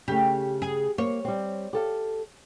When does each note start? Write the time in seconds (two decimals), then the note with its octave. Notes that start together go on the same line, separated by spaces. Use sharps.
0.08 C#3 A3 G4
0.62 G#4
0.98 A#3 C#5
1.25 G3 C4
1.73 G4 A4 F5